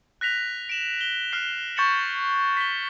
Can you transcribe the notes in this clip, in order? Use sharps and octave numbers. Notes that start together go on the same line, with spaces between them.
F#6 A#6 B6 F7
D7 E7 F#7
G7
F6 F#6 C7
C#6 G6 A6 C#7 E7 F#7
B6 G7